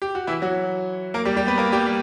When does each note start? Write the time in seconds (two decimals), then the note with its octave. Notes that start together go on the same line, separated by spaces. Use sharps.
0.02 G4
0.15 F#4
0.27 E3 E4
0.42 F#3 F#4
1.14 A#3 A#4
1.25 G3 G4
1.36 G3 G4
1.47 B3 B4
1.58 A#3 A#4
1.72 G3 G4
1.87 G3